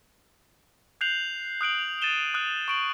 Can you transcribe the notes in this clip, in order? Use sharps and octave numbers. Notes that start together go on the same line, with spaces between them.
F#6 G6 C7 F7 F#7
D#6 F#6 D7 F#7
A6 D#7 E7 G7
D#6 F#6
C#6 D7 F#7